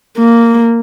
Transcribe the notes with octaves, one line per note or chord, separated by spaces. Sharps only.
A#3